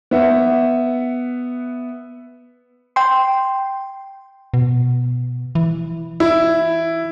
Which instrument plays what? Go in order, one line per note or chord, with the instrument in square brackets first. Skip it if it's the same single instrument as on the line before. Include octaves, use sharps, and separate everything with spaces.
[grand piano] B3 E5 F#5
[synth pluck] G5 C6
[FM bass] B2
E3
[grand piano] E4